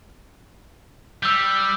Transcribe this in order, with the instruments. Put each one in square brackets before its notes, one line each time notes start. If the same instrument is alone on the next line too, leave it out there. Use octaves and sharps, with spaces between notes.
[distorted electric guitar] G3 [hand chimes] E6 G6